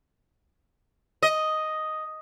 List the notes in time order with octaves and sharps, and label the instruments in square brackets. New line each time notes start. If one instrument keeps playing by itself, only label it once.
[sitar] D#5